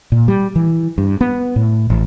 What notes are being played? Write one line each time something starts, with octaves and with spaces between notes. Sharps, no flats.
A#2
G3
E3
G2
B3
A2
A1